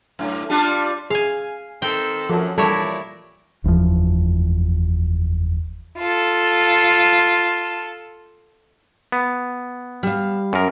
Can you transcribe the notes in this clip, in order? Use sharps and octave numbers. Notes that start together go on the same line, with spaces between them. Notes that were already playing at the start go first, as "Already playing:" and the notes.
F#2 A2
G3 D4 F4
G#4 F5 G#5
D#3 C4 A4 G5
F#2 F3 A4
A#2 E3 G3 E4 A4 C#5 D5
F#1 E2 C#3 F3
F4 A4
B3
G3 F5
F#2 A#4